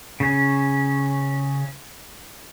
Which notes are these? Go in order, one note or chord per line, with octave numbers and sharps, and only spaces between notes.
C#3 C#4